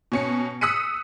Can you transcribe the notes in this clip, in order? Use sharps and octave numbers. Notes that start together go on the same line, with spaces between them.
B2 C#4 C#7
D#6 E6 F#6 B6 C#7 D#7